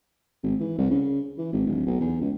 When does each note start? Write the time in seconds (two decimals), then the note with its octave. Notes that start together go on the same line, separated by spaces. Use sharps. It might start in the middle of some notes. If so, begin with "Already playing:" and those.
0.43 G#1
0.60 E3
0.78 C2
0.90 C#3
1.38 E3
1.53 G#1
1.67 D1
1.87 B1
2.00 E2
2.21 C#2